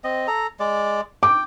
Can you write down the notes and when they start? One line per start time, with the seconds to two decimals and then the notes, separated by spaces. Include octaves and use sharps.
0.04 C4 D#5
0.27 A4 A#5
0.60 G#3 D5
1.23 G5 D6